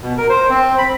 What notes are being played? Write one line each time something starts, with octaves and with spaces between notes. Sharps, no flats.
B2
A#4
C5
C4
B5